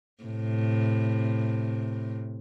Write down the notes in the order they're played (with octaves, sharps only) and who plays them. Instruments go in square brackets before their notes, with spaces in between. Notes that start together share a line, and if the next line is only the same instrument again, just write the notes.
[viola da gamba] A2 C3